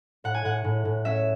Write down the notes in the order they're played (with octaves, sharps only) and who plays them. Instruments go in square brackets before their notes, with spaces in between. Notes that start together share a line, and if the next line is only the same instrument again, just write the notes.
[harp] A2 F#5
G#5
A2 F#5
A2
A2
C#4 E5